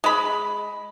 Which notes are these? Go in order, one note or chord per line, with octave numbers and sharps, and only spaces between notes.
G#3 B5